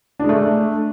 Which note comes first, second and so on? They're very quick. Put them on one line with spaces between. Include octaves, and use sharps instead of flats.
D4 G#3 A3